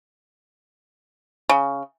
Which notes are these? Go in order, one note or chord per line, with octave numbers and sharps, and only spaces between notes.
C#3